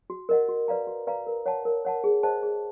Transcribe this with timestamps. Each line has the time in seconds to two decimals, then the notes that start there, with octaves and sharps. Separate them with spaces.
0.10 F#4
0.29 A#4 D#5 F#5
0.49 F#4
0.68 B4 D5 F5 A#5
0.87 F#4
1.07 B4 D5 F5 A#5
1.27 A#4
1.46 C#5 F#5 A5
1.65 A#4
1.85 C#5 F#5 A5
2.04 G#4
2.23 C5 D#5 F#5 A5
2.43 G#4